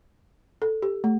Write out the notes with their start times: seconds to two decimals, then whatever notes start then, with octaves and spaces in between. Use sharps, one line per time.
0.62 A4
0.82 G4
1.04 A3